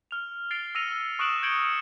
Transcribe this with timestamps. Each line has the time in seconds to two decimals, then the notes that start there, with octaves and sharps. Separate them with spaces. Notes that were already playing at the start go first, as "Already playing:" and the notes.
0.11 F6 F7
0.51 A6 C7 D7 F7 G7
0.75 E6 A#6 C#7 D#7 F7
1.19 C#6 D#6 F#6 D7 E7 F#7
1.43 G6 G#6 C#7 D7 F#7 G7